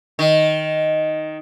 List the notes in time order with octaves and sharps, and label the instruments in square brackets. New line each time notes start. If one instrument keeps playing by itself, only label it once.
[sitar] D#3